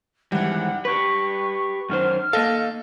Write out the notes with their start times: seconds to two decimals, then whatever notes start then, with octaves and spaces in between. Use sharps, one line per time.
0.32 G#2 D#3 E3 G3 F#5
0.85 G4 B4 C#6
1.89 F#2 D#3 C5 F6
2.33 A#3 A4 D#5 F5